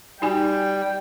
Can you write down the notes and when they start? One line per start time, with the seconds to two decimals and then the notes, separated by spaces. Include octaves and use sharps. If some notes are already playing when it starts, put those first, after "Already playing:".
0.22 G3 D#4 F#4 G5 G#5